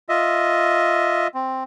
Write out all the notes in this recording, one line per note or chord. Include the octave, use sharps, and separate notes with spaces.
F4 D#5 E5
C4